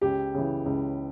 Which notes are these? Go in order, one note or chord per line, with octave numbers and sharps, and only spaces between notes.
C#2 G4
C#3 E3
C#2